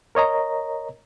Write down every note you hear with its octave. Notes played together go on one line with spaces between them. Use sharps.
A#4 C#5 D#5 A#5